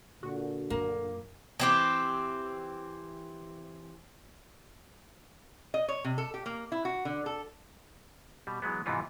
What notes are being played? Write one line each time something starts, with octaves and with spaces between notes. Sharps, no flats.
A#2 D3 F#4
F#2 A#3
E3 C4 G4
D#5
C#5
C3
A4
G4
A#3
E4
F#4
D3
A4
B2 G3
E3 F#3 G#3 B3
G#2 C3 E3 B3 D#4 F4